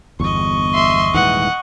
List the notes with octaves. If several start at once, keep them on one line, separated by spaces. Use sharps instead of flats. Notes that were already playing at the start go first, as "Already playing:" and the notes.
G1 E2 D#5 C#6
E5 C6
D#1 G#2 E3 F#5